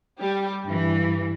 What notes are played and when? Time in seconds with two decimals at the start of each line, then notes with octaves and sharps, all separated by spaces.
0.20 G3 G4
0.67 G2 E3